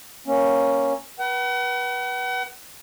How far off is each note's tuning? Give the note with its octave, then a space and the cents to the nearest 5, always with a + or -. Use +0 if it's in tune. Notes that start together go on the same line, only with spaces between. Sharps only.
A#3 +5 C#4 +0
B4 -30 F#5 +40